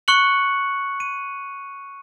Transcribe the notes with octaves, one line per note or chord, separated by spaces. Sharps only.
C#6 F#6 C#7 F#7
D#7